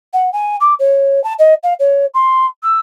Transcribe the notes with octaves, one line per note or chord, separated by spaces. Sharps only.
F#5
G#5
D6
C#5
A5
D#5
F5
C#5
C6
E6